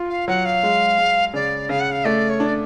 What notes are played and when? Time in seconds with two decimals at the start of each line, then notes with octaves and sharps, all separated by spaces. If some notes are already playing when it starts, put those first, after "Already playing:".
Already playing: F4
0.09 F5
0.28 F#3 F#5
0.45 F5
0.63 G#3
0.98 G#3
1.34 C#3 D5
1.69 C#3 F5
1.80 F#5
1.91 F5
2.05 A3 D5
2.29 C#5
2.40 D4
2.46 D5